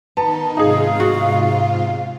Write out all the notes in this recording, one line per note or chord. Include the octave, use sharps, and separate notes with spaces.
D#3 B3 D#4 A5 A#5
G#2 C3 D#4 F4 G#4 F5
F#4